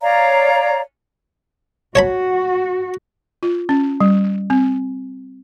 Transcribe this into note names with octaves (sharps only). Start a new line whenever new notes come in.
C#5 D5 F5 A#5
F#4 C#5 A5 B5
F4
C#4
G3
C4